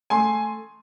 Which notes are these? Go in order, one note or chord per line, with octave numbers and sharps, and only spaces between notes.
A3 G#5 C6